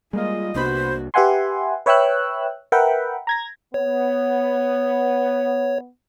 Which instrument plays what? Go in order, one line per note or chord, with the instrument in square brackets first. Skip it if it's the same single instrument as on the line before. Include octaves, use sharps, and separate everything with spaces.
[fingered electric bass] G3 [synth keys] G#3 A#3 F4 [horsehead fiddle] G#4 D#5
[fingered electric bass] C2 A#3 D4 [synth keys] C3 B3 B5 [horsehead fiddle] F#4 [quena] C5
[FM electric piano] G4 B4 E5 F#5 G#5 C6
B4 C#5 E5 G5 E6 F#6
A#4 B4 E5 F#5 G5 B5
A#5 G#6 A#6
[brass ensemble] B3 [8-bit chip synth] C#5